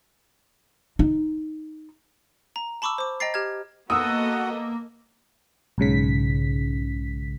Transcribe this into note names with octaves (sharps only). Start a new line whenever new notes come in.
D#4
A#5
A5 B5 C#6 D6 E6
C5 D6
D#5 G5 A#5 A6 C7
G4 F6 G#6
A#3 B3 F#4 A4 D#5 F#5 D#6 E6
B1 G#2 C#3 B6